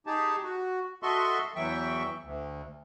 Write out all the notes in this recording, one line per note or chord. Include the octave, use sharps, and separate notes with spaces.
D#4 G4 G#4 A5
F#4
F#4 A4 D#5 E5 C6 C#6
E2 E3 F#3 E5 G5 C#6
D2